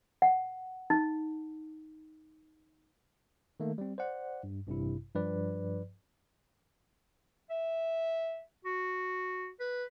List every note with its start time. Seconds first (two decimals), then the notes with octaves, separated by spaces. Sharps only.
0.22 F#5
0.90 D#4
3.60 D#3 A3 A#3
3.78 G3 C4
3.98 C5 D5 F#5
4.43 G2
4.67 A1 G2 C3 E4
5.15 G2 F3 B4 D5
7.50 E5
8.65 F#4
9.60 B4